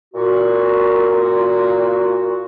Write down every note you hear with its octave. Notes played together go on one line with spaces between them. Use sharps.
A#2 F#4